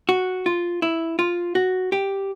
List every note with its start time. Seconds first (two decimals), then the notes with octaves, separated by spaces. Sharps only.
0.09 F#4
0.46 F4
0.82 E4
1.19 F4
1.55 F#4
1.92 G4